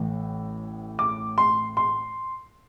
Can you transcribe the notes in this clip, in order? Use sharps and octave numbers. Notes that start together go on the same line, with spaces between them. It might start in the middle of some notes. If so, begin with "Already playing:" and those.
Already playing: A1 A2 E3
D6
C6
C6